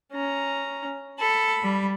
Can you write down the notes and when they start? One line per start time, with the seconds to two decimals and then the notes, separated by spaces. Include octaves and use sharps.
0.13 C#4 A#5
1.20 A4 B5
1.63 G3